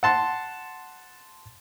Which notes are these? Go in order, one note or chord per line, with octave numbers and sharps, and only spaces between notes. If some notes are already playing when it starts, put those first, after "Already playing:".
F#5 A5 C6